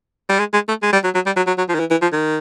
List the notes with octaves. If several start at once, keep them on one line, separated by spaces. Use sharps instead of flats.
G3
G#3
G#3
A3
G#3
G3
F#3
F#3
G3
F#3
F#3
F#3
F3
D#3
E3
E3
F3
D#3